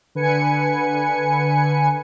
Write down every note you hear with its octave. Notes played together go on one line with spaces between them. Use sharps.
D3 B4 G#5 C#7